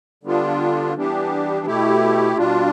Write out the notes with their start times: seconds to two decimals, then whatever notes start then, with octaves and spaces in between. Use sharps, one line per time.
0.23 D3 G3 B3 D4 F4
0.95 E3 G3 B3 D4 G4
1.66 B2 A3 E4 G4
2.37 B2 G3 D4 F4